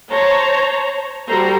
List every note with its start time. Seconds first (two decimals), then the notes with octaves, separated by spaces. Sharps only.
0.12 C5 C#5 A5 A#5
1.27 G3 F#4 A4 C5 A#5